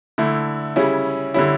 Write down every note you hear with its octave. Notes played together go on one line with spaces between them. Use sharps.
D3 A3 E4
C#3 G3 C#4 E4
D3 G3 C#4 E4